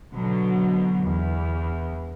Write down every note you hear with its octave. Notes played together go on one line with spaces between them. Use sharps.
B2 D3 F#3
E2